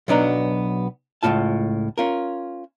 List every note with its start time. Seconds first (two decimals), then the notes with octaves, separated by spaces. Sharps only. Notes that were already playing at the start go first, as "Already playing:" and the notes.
0.08 B1 F#3 B3 D4 D#4 A#5
1.23 C#2 F#2 A2 F4 A5
1.98 C#4 F4 A#4